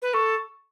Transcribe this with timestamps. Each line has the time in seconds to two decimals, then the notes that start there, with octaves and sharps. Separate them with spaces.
0.02 B4
0.13 A4 C#6